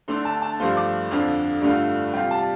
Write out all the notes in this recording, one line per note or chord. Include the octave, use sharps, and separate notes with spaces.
D3 A3 D4 C6
A5
A5
G2 F3 A3 F4 C6
D6
F2 D3 F3 D4 F4
G2 D3 A3 F4
C3 G3 F4 G5
A5